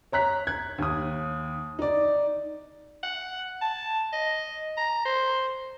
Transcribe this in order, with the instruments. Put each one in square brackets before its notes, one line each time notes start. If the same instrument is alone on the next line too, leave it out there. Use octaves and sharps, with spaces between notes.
[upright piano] C#5 A#5 F#6 B6
F#6 G#6
D#2 D#6
D#4 D5
[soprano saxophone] F#5
A5
D#5
A#5
C5